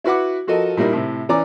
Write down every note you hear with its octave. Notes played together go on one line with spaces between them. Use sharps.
E4 F#4 B4 F#5 D6
F3 F#4 A4 A#4 D#5
A#2 G3 D#4 E4 A#4
A2 C3
E3 C#4 D5 A#5 D6